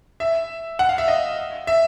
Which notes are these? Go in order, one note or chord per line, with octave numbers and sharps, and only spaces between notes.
E5
F#5
F5
E5
D#5
E5